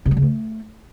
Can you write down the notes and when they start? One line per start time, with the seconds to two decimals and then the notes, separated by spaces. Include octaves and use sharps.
0.06 C3
0.11 F#3
0.17 C#3
0.22 A3